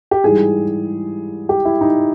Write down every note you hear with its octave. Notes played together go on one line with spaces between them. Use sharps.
G4
G#2 E3 G3 G#4
G4
E4
D#4